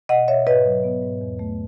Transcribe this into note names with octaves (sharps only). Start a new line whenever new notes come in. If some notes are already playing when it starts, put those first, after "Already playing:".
B2 D#5 F#5
B2 C#5 E5
G#2 B4 D#5
F#3
B3
G#2
E2
A3